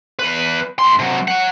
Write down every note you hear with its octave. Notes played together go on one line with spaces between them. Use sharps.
E2 B4
A2 C6
C3 F#3
C#5 F#5